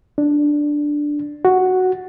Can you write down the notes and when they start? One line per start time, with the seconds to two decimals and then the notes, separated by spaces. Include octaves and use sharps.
0.18 D4
1.45 F#4